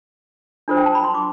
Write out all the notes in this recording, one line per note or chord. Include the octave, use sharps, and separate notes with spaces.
D4 F4 A4 C5
G5
A5
B5
C6
D6